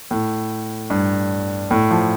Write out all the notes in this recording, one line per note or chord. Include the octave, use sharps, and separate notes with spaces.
A2
G2
A2
F3